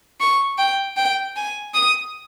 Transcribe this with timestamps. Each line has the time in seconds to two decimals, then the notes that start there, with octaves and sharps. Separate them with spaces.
0.20 C#6
0.58 G5
0.97 G5
1.36 G#5
1.74 D#6